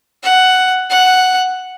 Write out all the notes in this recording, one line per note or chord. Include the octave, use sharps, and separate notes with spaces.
F#5
F#5